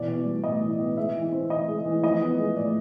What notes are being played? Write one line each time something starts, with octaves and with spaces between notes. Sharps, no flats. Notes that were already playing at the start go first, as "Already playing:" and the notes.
Already playing: B2 E3 D5
B3
G3
A2 D#5
E3
B3
G#3 E5
E3
C4
E3 D#5
G#3
E3
F3 D#5
B3
G#3
A2 D5